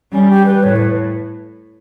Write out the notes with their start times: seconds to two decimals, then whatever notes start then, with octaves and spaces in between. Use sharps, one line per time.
0.12 G3 C#4
0.29 G4
0.45 B4
0.63 A2 C#5
0.76 B4